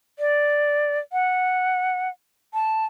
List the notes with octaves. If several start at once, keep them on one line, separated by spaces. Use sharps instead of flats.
D5
F#5
A5